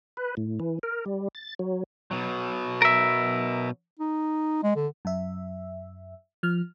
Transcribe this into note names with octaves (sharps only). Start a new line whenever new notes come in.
B4
A2
E3
A#4
G3
A6
F#3
B2 F#3
A#4 E5
D#4
G#3
D3
F#2 E5
F3 F6